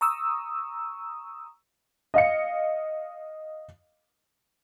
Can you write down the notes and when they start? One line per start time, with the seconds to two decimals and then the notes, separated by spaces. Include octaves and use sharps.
0.01 A#5 C#6 D#6 E6
2.14 D#5 F5 C#7